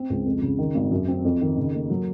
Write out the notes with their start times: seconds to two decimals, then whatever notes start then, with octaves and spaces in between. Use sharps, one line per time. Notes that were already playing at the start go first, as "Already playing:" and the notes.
Already playing: C4
0.10 C#2
0.26 F2
0.42 C#3
0.59 D#3
0.74 G#1
0.91 F#2
1.08 C4
1.25 F2
1.41 D#3
1.57 C#3
1.74 A#3
1.90 F#3